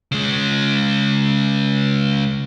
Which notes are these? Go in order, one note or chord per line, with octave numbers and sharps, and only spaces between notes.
C#3 G#3